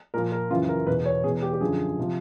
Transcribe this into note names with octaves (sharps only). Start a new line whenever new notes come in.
A#2 F3 A#4
A#4
F#2 C#3 E3 F4
A#4
E2 B2 B4
C#5
E2 B2 G#4
G4
G4
F#2 D3 F3 G#4
C3 F3